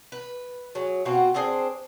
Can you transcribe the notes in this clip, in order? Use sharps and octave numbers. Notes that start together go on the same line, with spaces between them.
B4
F#3 G#4
B2 C4 F4 F#4
C4 D4 G#4 C5